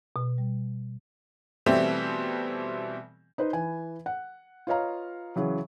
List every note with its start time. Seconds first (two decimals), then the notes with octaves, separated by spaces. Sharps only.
0.16 B2
0.38 G3
1.66 B2 E3 G3 A3 C4
3.38 D#4 B4 C5
3.53 E3 B4 G#5
4.06 F#5
4.67 F4 B4 C#5 D#5 F5 A#5
5.36 C#3 E3 F#3